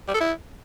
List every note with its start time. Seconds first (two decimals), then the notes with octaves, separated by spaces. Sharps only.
0.08 G3
0.14 A4
0.21 E4